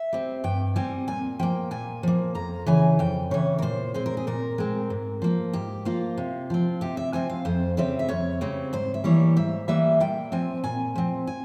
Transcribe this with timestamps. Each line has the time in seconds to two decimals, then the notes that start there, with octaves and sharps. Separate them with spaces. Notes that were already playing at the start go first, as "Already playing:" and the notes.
Already playing: E5
0.13 G3 C4
0.44 G2 G5
0.76 G3 C4 G#5
1.08 A#2 G#5
1.39 F3 A#3 G5
1.71 A#2 G#5
2.03 F3 A#3
2.35 F2 A#5
2.66 C#3 E3 G#5
2.99 F2 G5
3.31 C#3 E3 C#5
3.59 A#4
3.62 A#2 C5
3.94 G#3 C4 C5
4.06 A#4
4.17 G#4
4.27 A#2 A#4
4.58 G#3 C4
4.90 G#2
5.22 F3 A#3
5.53 G#2 G4
5.85 F3 A#3 F4
6.18 C3
6.50 F3 C4
6.81 C3 G4
6.97 E5
7.13 F3 C4 G#5
7.30 F5
7.45 F2 C5
7.77 C#3 G3 C4 E5
7.99 E5
8.09 F2 C#5
8.41 C#3 G3 C4
8.73 G#2 C5
8.94 E5
9.04 E3 G3 A#3 C#5
9.37 G#2 E5
9.68 E3 G3 A#3 E5
10.00 A#2 G5
10.32 F3 C4 G#5
10.64 A#2 G#5
10.96 F3 C4
11.27 G#5